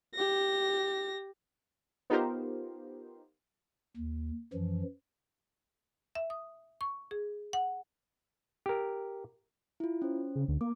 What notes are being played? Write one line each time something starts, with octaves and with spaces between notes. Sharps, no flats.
G4 A#6
B3 D#4 F4 G4 A#4 C5
D#2
F#2 E3 F3
E5
D#6
C#6
G#4
F#5
G4 A#4
E4 F4
C#4 C5
C#3
D2
A#3 D6